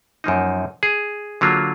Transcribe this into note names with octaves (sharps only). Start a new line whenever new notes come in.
F#2 F3 A#3 D#4
G#4
D3 F#3 A#3 F4